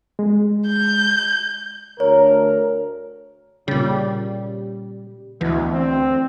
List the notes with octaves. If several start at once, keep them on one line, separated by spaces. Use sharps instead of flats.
G#3
G6
D2 A#4 C#5
A#2 C#3 G3
D2 B2 E3
C4